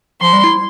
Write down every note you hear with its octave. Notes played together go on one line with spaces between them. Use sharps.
F3 C6
G3
E4